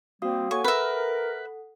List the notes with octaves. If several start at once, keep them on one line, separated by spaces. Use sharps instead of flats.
G3 A#3 C4 F#4 F5 D#6
A#3 A4 C#5 F#5 G#5 C#6
A#4 B4 E5